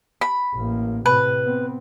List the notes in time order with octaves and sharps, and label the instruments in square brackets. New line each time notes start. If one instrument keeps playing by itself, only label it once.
[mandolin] B5
[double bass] A1 A#3
[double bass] A2 C3 [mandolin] B4
[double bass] B3 C4